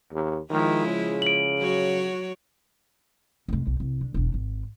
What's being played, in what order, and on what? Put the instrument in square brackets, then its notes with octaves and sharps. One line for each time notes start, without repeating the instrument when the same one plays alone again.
[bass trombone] D#2
[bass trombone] D#3 [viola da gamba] F3 G#3 E4
[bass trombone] C#3
[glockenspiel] D7 F#7
[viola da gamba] F#3 F#4 C#5
[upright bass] F1 G#3
B1
C2
D3
E1 D4
G#1